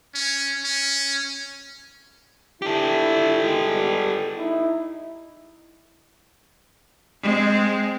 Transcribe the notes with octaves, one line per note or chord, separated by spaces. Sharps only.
C#4
C#4
D4 E4 G4 A4
B2 D#3 G#3
G3 G#3 B3
D#4 E4
G#3 C4